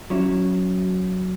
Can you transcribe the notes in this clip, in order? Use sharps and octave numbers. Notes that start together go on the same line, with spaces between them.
F#3 C#4 E4